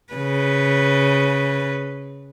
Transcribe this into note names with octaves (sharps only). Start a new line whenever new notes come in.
C#3 B4